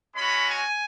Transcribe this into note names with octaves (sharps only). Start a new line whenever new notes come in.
G#3 C#4 F#4 B5
G#5